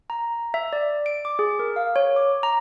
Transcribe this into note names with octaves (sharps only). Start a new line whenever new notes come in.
A#5
E5
D5
D7
D6
G#4
A#4
F5
C#5
D6
A#5